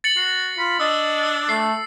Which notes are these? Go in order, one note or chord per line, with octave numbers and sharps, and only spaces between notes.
A6 C#7 F#7
F#4 C7
F4 B5
D4 D#5 E6
E6
A3 C7